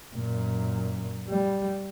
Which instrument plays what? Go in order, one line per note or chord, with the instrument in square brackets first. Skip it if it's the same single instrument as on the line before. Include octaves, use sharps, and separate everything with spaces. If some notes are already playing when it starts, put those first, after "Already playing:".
[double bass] F#2 A#2
G3